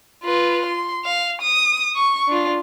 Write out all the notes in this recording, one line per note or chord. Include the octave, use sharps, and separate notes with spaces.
F4 B4
C6
F5
D#6
C#6
D4 F4